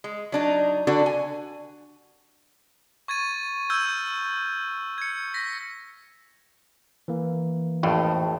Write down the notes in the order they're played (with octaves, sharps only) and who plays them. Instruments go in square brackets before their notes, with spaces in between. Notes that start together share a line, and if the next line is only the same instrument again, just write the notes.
[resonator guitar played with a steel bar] G#3
F#3 D4 D#4
D3 D4 F#4 A4
G#5
[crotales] C#6 G#6 A6 D#7
E6 F6 G6 G#6
G#6 C#7
A#6 B6
[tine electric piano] E3 A#3
[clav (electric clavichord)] G#1 F2 A2